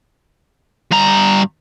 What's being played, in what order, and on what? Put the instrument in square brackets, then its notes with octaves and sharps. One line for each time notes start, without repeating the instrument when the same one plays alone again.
[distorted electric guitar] G2 A#5